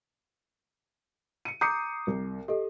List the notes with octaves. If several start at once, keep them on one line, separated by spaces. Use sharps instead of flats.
C#7 D#7
A#5 D6 D#6 G6 C7 C#7
C2
G4 A4 D#5